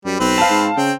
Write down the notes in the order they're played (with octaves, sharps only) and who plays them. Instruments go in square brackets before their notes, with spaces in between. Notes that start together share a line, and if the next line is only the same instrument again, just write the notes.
[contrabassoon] F#2 [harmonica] G3
[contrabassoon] B1 [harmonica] C4 B4
[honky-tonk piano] F5 A5
[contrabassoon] G#2
[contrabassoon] C#3 [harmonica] C4 G5